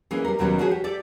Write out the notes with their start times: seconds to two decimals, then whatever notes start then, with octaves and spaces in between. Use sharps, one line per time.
0.11 E3 G#3 A#3 C#4
0.25 G3 A#4
0.39 D#2 B2 D#3 F#3 G3 C#4
0.59 F3 C#4 F#4 G#4
0.71 G4
0.84 G4 A4 D5